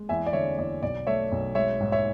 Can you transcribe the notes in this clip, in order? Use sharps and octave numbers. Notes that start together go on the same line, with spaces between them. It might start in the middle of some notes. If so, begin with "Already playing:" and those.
Already playing: G#3
E2 E5 G#5
D5
D3 C#5 E5
E2 D5
B1 D5
A3 C#5 E5
B1
G#3 C#5 E5
G#2
C#5 E5